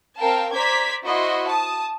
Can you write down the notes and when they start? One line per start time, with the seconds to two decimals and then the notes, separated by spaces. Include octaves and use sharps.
0.18 C4 A#4 F5 G5 A5
0.53 C5 D5 A#5 D6 G#6 B6
1.04 E4 F#4 C5 D#5 C6
1.47 A5 D#6